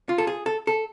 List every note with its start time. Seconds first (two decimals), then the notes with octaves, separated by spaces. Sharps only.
0.09 F4
0.18 A4
0.27 G#4
0.46 A4
0.67 A4